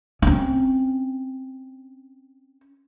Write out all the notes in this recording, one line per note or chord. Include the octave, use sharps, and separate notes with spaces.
C4 C#4